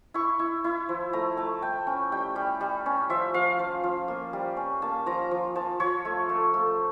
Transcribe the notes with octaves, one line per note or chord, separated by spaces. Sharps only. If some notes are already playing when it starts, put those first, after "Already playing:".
E4 C#6
E4
E4
F3
A3 A#5
A3 A5
A3 G5
C#4 G5
G3 G5
G3
G3
C#4
F3 E5
F3 F5
F3
F3
A#3
G3
C#4
A#3 A5
F3 A#5
F3
F3 A5
F3 C#5
A3
A3
A3